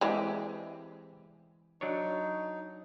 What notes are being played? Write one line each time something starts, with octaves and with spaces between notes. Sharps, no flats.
E3 G#3 C4 G4
F#3 D4 D#4 C#5